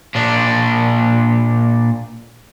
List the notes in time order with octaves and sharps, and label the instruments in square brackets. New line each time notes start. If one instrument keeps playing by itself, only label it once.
[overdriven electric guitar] A#2 D4